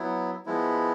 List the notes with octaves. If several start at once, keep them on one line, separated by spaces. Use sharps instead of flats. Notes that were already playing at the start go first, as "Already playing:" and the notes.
Already playing: F#3 B3 E4
F3 G#3 B3 E4